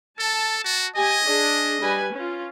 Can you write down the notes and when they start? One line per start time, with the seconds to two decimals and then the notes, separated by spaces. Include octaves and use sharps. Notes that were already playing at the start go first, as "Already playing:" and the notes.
0.19 A4 A5
0.64 F#4
0.96 G4 D#5 G#5
1.25 D4 G#4
1.80 G3 B4 G#5
2.14 C#4 F4